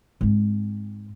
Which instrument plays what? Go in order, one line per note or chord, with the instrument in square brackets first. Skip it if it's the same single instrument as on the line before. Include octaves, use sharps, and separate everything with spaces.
[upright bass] G#2 C4